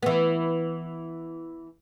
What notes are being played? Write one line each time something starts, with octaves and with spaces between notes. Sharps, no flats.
E3 B3